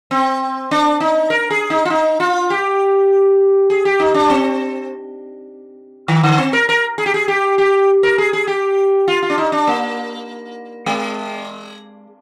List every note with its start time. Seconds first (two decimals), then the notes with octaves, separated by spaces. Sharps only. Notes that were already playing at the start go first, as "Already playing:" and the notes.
0.11 C4
0.71 D4
1.00 D#4
1.30 A#4
1.50 G#4
1.70 D#4
1.85 F4
1.90 D#4
2.20 F4
2.50 G4
3.70 G#4
3.85 G4
4.00 D#4
4.14 D4
4.30 C4
6.08 D#3
6.23 D3
6.38 C4
6.53 A#4
6.69 A#4
6.98 G#4
7.06 G4
7.14 G#4
7.28 G4
7.58 G4
8.03 A#4
8.18 G#4
8.33 G#4
8.47 G4
9.08 F4
9.23 F4
9.30 D4
9.38 D#4
9.52 D4
9.67 A#3
10.86 G#3